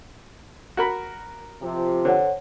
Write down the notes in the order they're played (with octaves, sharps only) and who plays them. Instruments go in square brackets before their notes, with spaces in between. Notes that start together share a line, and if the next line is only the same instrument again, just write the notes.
[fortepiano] F#4 A#4 B5
[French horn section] C3 F3
[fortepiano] D3 [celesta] C5 C#5 F#5